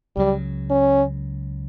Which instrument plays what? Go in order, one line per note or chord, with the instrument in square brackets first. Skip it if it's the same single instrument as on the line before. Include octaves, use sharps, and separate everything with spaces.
[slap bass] C#2 C#3 F#3 [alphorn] G3
[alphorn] C#4